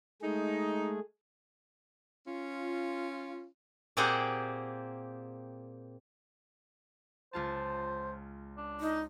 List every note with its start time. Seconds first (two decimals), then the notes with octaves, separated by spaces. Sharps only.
0.22 G#3 A3 D#4 G#4
2.27 C#4 F4
3.97 A#2 A#3 C4 G4 G#4 F#5
7.33 C#2 F4 C5 A5
8.57 D4
8.80 D#4